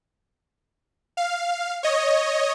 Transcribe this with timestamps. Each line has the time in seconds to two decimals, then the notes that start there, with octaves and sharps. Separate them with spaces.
1.17 F5
1.83 C#5 D#5